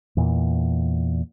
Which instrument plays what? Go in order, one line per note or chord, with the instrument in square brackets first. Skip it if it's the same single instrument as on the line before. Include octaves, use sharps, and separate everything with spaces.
[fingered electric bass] E2 A#2